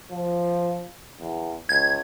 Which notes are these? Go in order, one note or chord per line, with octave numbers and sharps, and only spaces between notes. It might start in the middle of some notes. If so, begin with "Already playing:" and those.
F3
E2
C#2 G#6